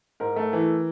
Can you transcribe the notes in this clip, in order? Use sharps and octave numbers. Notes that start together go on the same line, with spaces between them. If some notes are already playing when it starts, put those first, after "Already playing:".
G#2 A#4
A3
E3